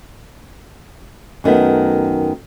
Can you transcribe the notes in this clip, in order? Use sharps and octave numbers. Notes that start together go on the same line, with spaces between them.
F#2 D#3 A3 B3